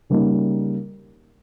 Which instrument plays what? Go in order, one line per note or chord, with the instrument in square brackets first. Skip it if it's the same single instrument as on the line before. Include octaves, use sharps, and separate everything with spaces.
[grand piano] C#3 G3 A#3 D#4